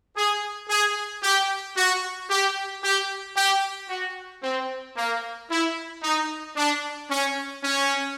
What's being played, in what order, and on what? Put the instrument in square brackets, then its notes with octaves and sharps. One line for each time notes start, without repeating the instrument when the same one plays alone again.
[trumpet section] G#4
G#4
G4
F#4
G4
G4
G4
F#4
C4
A#3
E4
D#4
D4
C#4
C#4